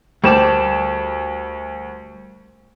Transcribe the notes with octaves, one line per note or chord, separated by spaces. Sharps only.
D2 G3 A#4 C5 D5 A5 E7